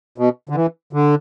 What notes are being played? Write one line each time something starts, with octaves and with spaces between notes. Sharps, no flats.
B2
D3
E3
D3